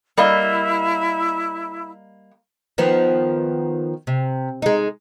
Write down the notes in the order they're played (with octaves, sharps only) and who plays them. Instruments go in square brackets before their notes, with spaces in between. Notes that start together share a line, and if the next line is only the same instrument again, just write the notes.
[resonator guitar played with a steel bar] G3 A#3 D#5 [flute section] E4
[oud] D#3 F3 B3
C3
G#3 D#4